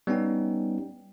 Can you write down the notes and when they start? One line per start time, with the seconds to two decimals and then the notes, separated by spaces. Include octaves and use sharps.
0.07 G3 B3 C#4 D#4 G5